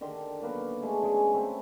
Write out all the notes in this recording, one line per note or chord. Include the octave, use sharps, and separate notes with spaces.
D3 D#3 G4 C6
F#3 A#3 B3
D3 G#3 A3
C#3 F#3 G#3 G#4
A3 C4 C#4 B4